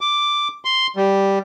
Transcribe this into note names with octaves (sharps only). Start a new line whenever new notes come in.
D6
C6
G3